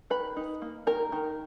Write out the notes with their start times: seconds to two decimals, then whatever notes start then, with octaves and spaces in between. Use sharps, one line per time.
0.10 D#3 B4 B5
0.36 D#4
0.62 A#3
0.87 D#3 A#4 A#5
1.12 D#3